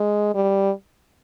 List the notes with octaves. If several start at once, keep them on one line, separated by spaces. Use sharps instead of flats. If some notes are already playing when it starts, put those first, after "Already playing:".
Already playing: G#3
G3